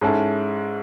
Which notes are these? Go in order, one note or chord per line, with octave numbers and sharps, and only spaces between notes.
G#2 G#3 C#4 E4 A4